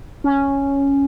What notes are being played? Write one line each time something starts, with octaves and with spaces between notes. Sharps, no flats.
C#4